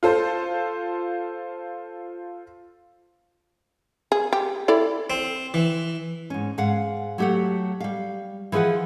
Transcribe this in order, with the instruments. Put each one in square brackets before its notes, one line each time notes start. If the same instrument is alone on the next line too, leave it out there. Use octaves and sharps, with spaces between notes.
[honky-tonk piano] F4 A4 C5
[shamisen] G#4
G4
E4 A4 D5
[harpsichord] C4
E3
[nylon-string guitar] G#2 C#4
G#2 F5 F#5
F#3 A3 G4 A4 F#5
G3 F5
E3 F3 G#4 B4 F#5